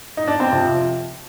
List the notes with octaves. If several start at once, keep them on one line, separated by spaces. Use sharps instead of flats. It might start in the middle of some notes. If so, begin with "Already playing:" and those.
D#4
D4
C4
F2 C3 F3